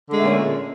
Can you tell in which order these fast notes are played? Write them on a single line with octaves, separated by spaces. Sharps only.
D3 G#3 A3 A#2 C#4